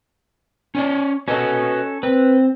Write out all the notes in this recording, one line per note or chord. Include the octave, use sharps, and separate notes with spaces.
C#4 C#5 D5
C#4 F#4 A4 B4 D#5
C4 B4